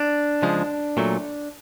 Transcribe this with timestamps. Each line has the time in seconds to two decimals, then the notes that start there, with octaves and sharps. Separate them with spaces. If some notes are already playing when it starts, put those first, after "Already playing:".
Already playing: D4
0.42 C#3 F3 G#3
0.97 A#2 F#3 A3